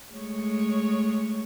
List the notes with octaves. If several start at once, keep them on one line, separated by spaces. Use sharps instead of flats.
G#3 A3 C#5